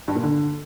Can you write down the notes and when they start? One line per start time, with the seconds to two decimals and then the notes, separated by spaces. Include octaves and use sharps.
0.08 G2
0.15 A#2
0.23 D3